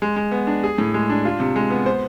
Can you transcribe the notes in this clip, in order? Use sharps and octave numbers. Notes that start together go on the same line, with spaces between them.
G#3
G#3
B3
D4
G#4
A2
G#3
D4
F4
C3
G#3
B3
C5